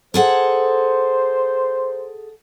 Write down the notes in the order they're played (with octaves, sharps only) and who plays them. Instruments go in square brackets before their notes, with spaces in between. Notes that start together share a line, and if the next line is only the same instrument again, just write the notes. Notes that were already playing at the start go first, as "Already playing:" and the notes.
[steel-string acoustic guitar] G#4 A4 F#5 [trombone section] C5